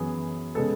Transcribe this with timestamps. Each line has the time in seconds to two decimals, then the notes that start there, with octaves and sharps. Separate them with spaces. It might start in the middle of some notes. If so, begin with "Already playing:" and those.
Already playing: F#2 E3 B3 G#4
0.55 C#3 G#3 B3 A4